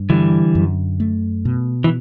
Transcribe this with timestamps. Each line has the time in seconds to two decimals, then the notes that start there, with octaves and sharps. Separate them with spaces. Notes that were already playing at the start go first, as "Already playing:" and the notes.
Already playing: G2
0.10 D3 E3 G3
0.55 F#2
1.00 A3
1.45 B2
1.84 E3